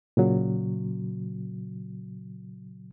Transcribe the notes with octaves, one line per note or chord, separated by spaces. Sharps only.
A#2 C#3 F#3